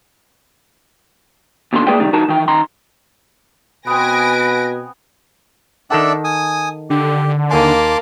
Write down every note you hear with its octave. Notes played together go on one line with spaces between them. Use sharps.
D#2 B2 D3 A4 C6
A3 A#3 G#4 B4 D5 G5
C3 D#3 G3
E3 D#4 F#4 A#4 A5
D#3 E3 G5
D#3 A#5 C6
B2 B3 C4 B4 G#5 A#6 D7
D#3 D4 A4 D5 E5 F#5
G#5 D#6
D3 G4
D#2 A#3 G#5 A5 C6 D6